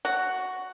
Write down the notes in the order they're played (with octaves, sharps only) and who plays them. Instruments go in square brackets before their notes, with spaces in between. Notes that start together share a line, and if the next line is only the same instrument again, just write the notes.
[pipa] F#4